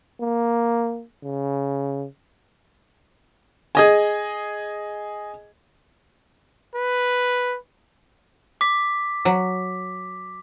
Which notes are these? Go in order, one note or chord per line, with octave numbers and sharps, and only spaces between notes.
A#3
C#3
G#4 D#5 G#5
B4
D6 B6
F#3